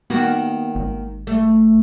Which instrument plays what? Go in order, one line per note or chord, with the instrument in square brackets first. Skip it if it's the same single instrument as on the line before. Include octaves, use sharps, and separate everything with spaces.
[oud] D#3 A#3 F#4 [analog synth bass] B3
[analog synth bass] G#1
[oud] A3